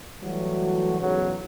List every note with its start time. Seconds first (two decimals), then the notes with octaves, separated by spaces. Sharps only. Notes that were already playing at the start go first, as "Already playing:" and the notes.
0.22 E3 F#3 G3 A3 F#4
1.00 B1 E2 G#2 C#3 F#3